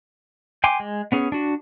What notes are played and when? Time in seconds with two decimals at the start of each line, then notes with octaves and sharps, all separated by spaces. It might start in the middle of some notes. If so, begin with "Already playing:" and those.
0.64 G5 G#5 C6 D6
0.80 G#3
1.12 B3 C#4 G#4
1.32 D4 F#4